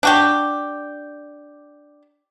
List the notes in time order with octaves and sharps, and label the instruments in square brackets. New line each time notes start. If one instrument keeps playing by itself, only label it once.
[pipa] D4 F#4 G4